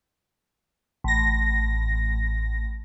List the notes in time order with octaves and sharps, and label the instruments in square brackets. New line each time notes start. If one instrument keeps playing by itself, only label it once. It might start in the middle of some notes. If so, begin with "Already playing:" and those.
[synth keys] A1 A#6